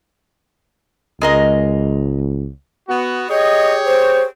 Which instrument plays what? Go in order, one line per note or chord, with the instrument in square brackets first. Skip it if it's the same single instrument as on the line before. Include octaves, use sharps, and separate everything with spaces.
[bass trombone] C#2 [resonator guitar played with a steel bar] G#3 A#4 D#5
[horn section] B3 F#4
[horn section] G4 G#4 C#5 [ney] D#5
[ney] C5